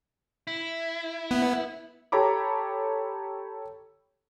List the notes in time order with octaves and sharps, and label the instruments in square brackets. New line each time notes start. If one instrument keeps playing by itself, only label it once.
[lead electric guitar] E4
[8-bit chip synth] B3
[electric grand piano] G4 A4 C#5 A#5 B5 D6